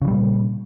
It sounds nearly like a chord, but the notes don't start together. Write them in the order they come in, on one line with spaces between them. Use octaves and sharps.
C#3 E3 G3 A#2